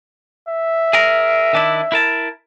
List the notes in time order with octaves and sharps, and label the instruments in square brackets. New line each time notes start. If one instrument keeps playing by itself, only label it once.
[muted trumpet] E5
[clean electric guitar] G#4 A#4
D#3 D4 E4
E4 A#4 A5